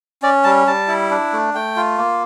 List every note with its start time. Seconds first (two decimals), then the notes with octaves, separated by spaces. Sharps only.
0.22 C#4 D5
0.44 G3 A5
0.67 G3 A5
0.88 E4
1.10 D4
1.33 A3
1.54 A3 G5
1.76 F4
1.98 A#3